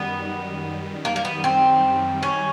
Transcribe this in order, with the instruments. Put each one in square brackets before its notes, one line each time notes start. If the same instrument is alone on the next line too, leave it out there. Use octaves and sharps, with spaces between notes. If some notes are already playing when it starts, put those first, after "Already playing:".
Already playing: [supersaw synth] F#2 D#3 G3 [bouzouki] B3
[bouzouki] A#3
A#3
B3
C4
C#4